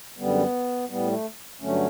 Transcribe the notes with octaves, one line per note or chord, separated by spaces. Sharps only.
F#2 D3 G3 B3
A2 G3 B3
A3
G2 D3 F#3 A3 C#4